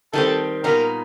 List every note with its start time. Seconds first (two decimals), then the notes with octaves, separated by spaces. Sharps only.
0.13 D#3 G3 C4 A4
0.64 A#2 G3 B3 D#4 A#4